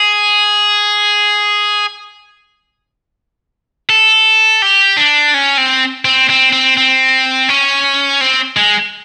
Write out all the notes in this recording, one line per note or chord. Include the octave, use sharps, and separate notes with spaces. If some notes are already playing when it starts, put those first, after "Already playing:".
Already playing: G#4
A4
G4
D4
C#4
C4
C4
C4
C4
C4
C#4
C4
G#3